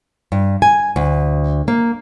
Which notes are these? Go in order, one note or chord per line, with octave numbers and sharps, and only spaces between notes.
G2
G#5
D2
A#3